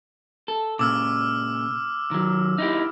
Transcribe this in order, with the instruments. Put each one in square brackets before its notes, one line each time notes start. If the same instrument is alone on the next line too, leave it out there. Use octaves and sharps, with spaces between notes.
[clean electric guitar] A4
[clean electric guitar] A#2 C#3 [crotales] D6 E6 F6
[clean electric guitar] D#3 F#3
D#4 E4 G4